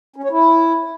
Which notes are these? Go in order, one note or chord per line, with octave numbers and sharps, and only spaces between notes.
C#4
C#5
E4